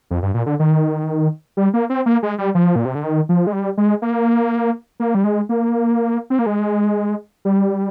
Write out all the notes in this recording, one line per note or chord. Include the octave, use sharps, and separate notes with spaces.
F2
G2
A#2
D3
D#3
G3
A#3
C4
A#3
G#3
G3
F3
A#2
C3
D3
D#3
F3
G#3
G3
G#3
A#3
A#3
G3
G#3
A#3
C4
A#3
G#3
G3